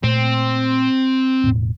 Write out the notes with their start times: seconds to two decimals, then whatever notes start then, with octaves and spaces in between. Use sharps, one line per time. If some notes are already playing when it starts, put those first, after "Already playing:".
0.04 A#2 A3 C4
1.44 E1 A2